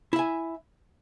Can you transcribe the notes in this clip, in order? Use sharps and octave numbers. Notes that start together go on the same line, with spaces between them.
E4 E5 G#5